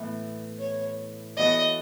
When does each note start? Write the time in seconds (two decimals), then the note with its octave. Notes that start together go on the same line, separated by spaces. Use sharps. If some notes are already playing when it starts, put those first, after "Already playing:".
Already playing: A2 E3 B3
0.59 C#5
1.37 E3 B3 F#4 A4 D#5